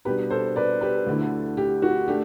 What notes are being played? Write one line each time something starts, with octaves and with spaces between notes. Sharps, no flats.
B2 G3 D4 G4 B4
A4 C5
B4 D5
G4 B4
D2 D3 A3 E4
G4
F#4
A3 D4 G4